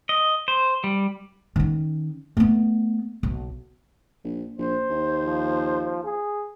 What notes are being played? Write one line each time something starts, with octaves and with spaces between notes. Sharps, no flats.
D#5
C5
G3
D#3 C#4
A3 B3
B1
A#1
A#1 C5
D#2
F3
G#4